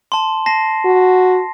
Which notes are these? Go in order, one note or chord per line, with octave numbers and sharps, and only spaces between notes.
A5 C6
A5 A#6 C7
F#4